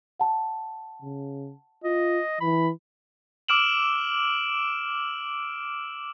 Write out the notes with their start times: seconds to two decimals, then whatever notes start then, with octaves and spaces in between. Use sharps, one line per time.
0.20 F#5 A5
1.02 C#3
1.84 F4 D#5
2.41 E3 B5
3.48 D6 E6 F6 D7 E7 F#7